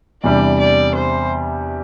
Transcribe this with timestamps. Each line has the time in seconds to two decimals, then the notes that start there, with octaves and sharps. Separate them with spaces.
0.23 E2 C3 G3 D4 D5
0.59 D5
0.95 C5